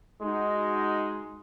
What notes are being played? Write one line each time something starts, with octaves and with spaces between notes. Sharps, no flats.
G#3 D#4 F#4